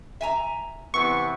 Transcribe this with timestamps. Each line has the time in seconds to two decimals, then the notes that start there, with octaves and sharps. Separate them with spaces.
0.21 E5 G#5 A#5
0.94 C3 E3 B3 C#6